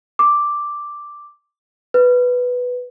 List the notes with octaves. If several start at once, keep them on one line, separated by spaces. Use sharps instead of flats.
D6
B4